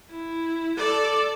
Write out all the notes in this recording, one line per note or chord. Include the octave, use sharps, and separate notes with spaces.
E4
A4 D5